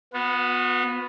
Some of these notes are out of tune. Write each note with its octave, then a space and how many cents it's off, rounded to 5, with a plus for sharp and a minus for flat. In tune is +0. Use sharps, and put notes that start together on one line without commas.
B3 +0 F#4 -45